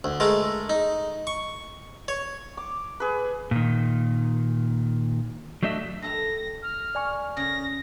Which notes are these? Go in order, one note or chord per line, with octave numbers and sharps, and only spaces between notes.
D2
G#3 A3 A#4
D#4
C#6
C#5
D6
G#4 B4
A#2 D#3
F#3 A3 D4 D#5 E5
G2 A4 A#5 A#6
F6
D5 G#5 C#6
C#3 C#5 A#6